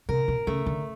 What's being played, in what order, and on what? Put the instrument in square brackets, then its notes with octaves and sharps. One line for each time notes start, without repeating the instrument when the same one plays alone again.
[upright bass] C3 [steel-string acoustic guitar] A#4
[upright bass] B2
[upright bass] C#3 [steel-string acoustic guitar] A3
[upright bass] D3